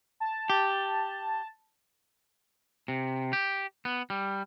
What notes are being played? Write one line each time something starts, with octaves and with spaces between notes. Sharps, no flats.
A5
G4
C3
G4
B3
G3